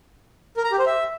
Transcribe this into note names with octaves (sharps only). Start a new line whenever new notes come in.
A#4
A#5
G4
C5
E5